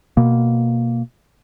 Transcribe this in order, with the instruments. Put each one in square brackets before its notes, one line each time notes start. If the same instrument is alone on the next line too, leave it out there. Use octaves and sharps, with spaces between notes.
[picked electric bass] B2 A#3